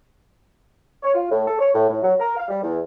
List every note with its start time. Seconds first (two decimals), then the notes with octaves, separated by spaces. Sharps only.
1.03 C#5
1.14 F4
1.31 A2
1.47 A4
1.59 C#5
1.75 A2
1.90 A2
2.03 F#3
2.20 A#4
2.37 F5
2.48 G3
2.62 E2